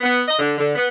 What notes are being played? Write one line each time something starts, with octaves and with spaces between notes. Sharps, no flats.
B3
D#5
D3
D3
B3